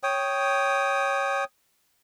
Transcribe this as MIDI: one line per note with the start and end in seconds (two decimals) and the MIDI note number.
0.03 1.44 73
0.03 1.44 79
0.03 1.44 87